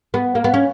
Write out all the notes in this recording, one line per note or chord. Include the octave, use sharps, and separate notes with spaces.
B3
A#3
B3
C#4